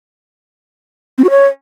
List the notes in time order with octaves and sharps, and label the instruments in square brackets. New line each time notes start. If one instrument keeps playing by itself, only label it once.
[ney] C4
F#4
C#5